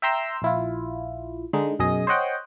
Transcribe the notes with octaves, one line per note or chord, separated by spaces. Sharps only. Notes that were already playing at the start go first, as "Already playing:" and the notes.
E5 G5 A#5 C6 E6
A#1 E4 F4
D3 G#3 D#4
B1 F#2 G#4 D#5 D#6
C5 C#5 D#5 F#5 G5